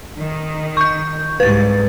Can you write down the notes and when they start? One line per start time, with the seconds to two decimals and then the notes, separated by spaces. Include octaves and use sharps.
0.18 D#3
0.77 C#6 G6
1.40 C2 G#2 B4 A6